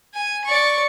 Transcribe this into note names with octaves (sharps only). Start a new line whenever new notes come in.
G#5
D5 C#6